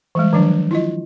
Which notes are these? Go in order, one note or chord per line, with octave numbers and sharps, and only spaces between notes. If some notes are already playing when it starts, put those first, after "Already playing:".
E3 G3 G#3
D#3 F3 F#3 D4
E4 F4 D#5